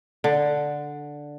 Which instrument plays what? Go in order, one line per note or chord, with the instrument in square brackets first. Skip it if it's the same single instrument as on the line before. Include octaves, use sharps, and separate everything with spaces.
[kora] D3